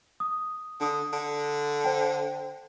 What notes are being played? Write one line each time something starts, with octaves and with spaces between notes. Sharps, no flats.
D#6
D3 D4 D#6
D3
C5 G5